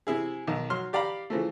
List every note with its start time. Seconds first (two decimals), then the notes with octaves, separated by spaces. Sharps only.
0.07 C3 E4 G#4
0.47 B1 D#3
0.70 F#3 C6 F6
0.93 G4 D5 F5 A#5 B5
1.30 C#3 E3 F3 A3